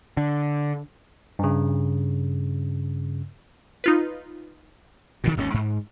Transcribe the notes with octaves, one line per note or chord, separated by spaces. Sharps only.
D3
G2 C#3
D#4 F4 B4
B2 D3 D#3
G#1 D#2 C#4
G#2